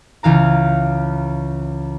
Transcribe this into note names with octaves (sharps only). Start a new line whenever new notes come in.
C#2 E3 F5 A#5